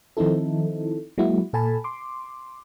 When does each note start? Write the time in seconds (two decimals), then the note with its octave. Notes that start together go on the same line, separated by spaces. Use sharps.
0.17 D#3 F3 C4 D#4 E4 A4
1.18 F#3 G#3 A#3 E4 F#4
1.53 A#2 A4 G#5 A5 B5
1.84 C6 D6